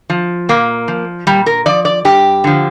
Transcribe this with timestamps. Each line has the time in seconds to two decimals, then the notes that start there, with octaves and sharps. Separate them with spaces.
0.10 F3
0.49 A#2 A#3
0.88 F3
1.27 A#2 G3
1.46 A#4
1.66 F3 D5
1.85 D5
2.05 G2 G4
2.44 D3 F3